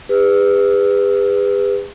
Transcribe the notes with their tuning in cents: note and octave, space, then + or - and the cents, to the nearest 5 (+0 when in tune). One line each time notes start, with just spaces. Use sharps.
G#4 -45 B4 +10